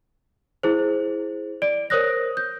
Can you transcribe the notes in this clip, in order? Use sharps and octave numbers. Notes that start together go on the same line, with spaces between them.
E4 G#4 C5
D5 D7
A#4 C5 C#5 D#6 F#6 A#6
G6